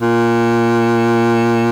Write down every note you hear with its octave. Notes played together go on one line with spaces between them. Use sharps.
A#2